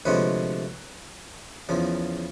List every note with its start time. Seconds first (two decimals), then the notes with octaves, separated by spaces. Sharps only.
0.05 D2 C3 F3 G#3 C4 B4 C#5
1.69 E2 C#3 F3